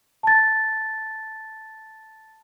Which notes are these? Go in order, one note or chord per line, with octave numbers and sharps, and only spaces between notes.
A5 A6